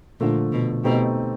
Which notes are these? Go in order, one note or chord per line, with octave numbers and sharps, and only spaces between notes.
A#2 D3 F3 A3
B2
B2 A3 C4 D#4 G4